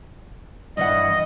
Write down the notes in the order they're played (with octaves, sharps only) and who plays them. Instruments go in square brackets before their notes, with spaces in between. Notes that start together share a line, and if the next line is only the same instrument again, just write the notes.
[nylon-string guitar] G2 E3 F#5 [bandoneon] D#5